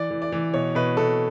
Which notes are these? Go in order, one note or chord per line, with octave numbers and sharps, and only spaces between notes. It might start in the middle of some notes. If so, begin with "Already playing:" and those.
Already playing: E3 D5
E3
D5
E3
B2 C#5
B2 B4
B2 A4